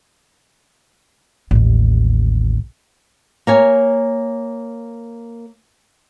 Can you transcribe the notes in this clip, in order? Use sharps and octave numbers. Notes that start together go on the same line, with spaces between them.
A1 D#2
A#3 C#5 G#5